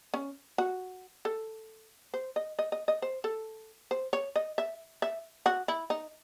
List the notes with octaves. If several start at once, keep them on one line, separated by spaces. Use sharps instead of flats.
C#4
F#4
A4
C5
D#5
D#5
D#5
D#5
C5
A4
C5
C#5
D#5
E5
E5
F#4
E4
D#4